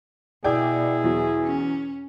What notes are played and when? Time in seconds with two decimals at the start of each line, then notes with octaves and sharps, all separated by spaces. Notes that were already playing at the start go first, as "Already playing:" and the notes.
0.44 B2 E4 G#4 D5 G5
1.04 E2 F#3
1.45 C#4